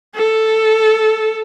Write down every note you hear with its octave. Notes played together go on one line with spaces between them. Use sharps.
A4